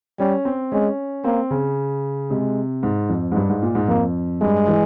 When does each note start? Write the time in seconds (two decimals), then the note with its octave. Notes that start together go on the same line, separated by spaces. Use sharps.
0.19 G3 C#4
0.45 C4
0.72 G#3 C#4
1.24 A#3 C4
1.50 C#3
2.30 C3 G#3
2.83 G#2
3.09 F2
3.32 G#2
3.36 G2
3.49 G#2
3.62 A#2
3.75 G#2
3.88 F2 A#3
4.41 G2 G#3
4.68 E3